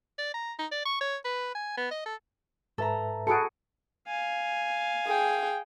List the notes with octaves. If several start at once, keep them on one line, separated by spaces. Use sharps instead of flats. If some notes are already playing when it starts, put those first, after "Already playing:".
D5
A#5
D#4
D5
C#6
C#5
B4
G#5
B3
D#5
A4
G#2 A4 B4 E5 A#5
F#4 G#4 A4 A5 B5 F#6 C#7 D7
F5 G#5
G#4 G5